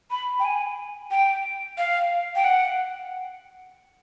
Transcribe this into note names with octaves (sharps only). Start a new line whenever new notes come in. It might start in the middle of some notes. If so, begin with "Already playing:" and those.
B5
G5
G#5
G5
F5
G5
F#5